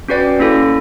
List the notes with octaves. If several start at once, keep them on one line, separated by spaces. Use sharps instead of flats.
C#4 F#4 B4 D5 G5
A#3 C#4 E4 A4